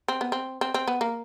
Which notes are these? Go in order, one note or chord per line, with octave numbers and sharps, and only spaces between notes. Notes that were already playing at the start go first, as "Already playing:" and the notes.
C4
B3
C4
C4
C4
B3
A#3